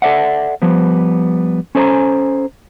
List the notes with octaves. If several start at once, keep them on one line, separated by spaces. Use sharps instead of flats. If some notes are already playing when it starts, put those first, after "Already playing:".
A4 A#4 D5 E5 F#5
F3 G3 B3
C#4 A4 C5 D5 G#5 A#5